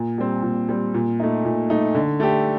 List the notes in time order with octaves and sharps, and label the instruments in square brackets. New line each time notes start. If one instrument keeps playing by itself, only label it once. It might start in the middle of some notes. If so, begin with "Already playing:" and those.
Already playing: [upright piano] A#2
G3 C4
A#2
G3 C4
A#2
A3 D#4
A#2
A3 D#4
D3
A3 D4 G4